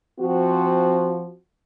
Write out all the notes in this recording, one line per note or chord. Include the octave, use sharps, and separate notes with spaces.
F3 C4 F#4